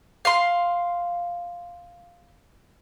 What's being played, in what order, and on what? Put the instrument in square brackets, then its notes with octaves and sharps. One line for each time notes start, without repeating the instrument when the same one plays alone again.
[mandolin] F5 C6